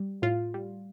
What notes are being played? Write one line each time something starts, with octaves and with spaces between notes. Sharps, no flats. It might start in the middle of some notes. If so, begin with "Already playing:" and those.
Already playing: G3
A2 F4
G3